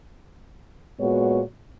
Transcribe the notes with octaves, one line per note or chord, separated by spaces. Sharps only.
A#2 G#3 B3 F#4 C#5